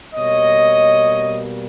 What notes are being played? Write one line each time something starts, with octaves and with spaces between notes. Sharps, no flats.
B2 G3 A#3 C#5 D#5